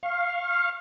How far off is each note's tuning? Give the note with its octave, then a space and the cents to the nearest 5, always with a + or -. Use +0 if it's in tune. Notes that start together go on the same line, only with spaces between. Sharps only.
F5 +0 C#6 -35